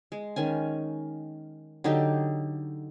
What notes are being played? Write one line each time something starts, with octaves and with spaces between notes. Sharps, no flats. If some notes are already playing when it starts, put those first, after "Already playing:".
G#3
D#3 C#4 G#5
D3 F#3 D#4 G4